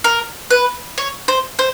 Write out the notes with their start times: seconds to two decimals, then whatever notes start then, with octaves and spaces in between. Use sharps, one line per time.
0.04 A#4
0.50 B4
0.98 C#5
1.28 C5
1.59 C5